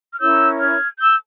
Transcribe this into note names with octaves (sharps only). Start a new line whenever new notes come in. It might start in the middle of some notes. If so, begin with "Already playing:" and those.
F6
C#4 E4 A#4 C#5 E6 G6
F6 G#6
E6 G6